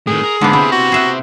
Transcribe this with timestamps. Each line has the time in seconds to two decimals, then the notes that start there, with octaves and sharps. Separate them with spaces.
0.07 A2 D#3 G#4
0.23 A#4
0.41 G#2 D3 A#3 B3
0.53 C3 E4 C5
0.72 F#4
0.92 G#4 E5 F#5